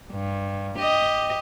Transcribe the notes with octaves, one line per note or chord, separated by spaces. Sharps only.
G2
G4 D#5